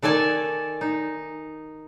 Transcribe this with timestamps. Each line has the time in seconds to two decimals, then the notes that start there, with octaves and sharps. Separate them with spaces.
0.02 D#3 A4 D5 G#5 A5
0.81 D#4